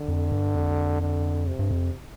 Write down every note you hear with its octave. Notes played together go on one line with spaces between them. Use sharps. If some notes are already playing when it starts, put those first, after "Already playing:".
Already playing: D3
F2
G2
F2
D3
C3
G2
F2